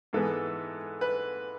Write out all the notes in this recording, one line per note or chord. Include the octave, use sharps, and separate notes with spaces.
G#2 E3 G#3 B3 A4
B4